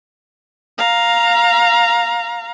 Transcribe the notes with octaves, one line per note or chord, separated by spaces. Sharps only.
F5 A#5